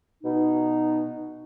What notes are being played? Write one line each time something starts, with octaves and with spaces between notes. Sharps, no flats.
B2 D#4